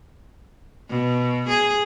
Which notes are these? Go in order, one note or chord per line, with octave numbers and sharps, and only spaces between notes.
B2
G#4